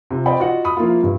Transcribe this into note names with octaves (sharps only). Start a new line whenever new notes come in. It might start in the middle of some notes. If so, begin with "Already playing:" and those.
C3 F4
C5 D5 D#5 G5 B5
F4 F#4 D#5 F#5
B5 D#6
F3 A#3 E4 F4
G2